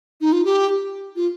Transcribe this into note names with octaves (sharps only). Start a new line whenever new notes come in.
D#4
F4
G4
F4